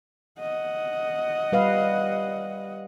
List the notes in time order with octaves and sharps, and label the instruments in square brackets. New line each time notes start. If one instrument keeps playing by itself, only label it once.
[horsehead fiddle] D#5 F#5
[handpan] G3 B4 F5